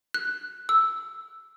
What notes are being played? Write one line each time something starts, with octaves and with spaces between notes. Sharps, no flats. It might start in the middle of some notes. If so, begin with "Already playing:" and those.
F#6
E6